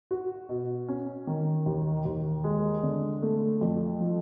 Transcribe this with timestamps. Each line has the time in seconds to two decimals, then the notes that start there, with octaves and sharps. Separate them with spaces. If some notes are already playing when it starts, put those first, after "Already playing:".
0.11 F#4
0.49 B2
0.88 C#4
1.27 D#3
1.66 D#2
2.05 D#2
2.44 G#3
2.83 D3
3.22 A3
3.61 F2
4.00 F3